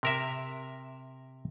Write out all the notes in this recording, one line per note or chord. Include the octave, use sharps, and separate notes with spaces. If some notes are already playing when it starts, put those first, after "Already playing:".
C3 A#4 E5